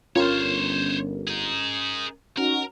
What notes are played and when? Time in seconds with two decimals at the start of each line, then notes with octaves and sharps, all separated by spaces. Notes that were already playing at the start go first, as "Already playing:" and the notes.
0.16 G1 C#4 F4 A#4 C5 C#5
1.28 D#4 G#4
2.38 C#4 D#4 F#4 A#4